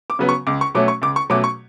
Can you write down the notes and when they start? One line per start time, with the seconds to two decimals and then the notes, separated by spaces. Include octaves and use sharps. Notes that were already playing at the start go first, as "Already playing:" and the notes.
0.10 D6
0.19 C#3 F#3 B3
0.29 C#6
0.47 C#2 D6
0.61 C#6
0.75 B2 F#3 A3 C#4 D6
0.88 C#6
1.02 C#2 D6
1.16 C#6
1.30 B2 F#3 A3 C#4 D6
1.44 C#6